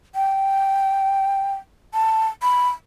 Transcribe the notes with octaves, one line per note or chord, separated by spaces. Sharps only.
G5
A5
B5